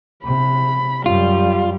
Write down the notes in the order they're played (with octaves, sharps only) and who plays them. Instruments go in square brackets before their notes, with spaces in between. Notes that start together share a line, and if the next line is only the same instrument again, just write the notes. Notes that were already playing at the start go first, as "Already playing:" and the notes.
[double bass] C3 [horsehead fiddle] B5
[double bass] F#2 [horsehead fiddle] G3 [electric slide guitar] F4